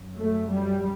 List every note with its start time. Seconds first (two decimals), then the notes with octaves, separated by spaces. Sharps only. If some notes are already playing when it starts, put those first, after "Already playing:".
Already playing: F#2
0.18 A3
0.50 G3